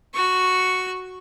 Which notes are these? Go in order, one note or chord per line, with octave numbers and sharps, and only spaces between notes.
F#4 C#6